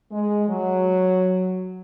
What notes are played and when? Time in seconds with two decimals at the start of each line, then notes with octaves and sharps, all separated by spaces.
0.11 G#3
0.49 F#3